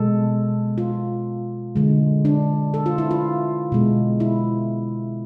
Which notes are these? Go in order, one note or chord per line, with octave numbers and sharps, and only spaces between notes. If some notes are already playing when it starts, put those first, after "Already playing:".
Already playing: B2 G#3 A4
F4
D3 G#3
D4
A4
F4
E4
F4
B2 G#3
E4